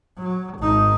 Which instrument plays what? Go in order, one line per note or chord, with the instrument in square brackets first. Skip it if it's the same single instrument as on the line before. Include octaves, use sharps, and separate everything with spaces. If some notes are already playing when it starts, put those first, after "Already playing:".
[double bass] F#3
G#1 D#4